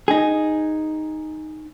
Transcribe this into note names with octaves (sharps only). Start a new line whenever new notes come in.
D#4 G#4